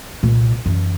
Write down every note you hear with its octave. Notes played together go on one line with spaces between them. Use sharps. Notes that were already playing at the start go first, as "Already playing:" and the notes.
C2 A#2
F#2 E3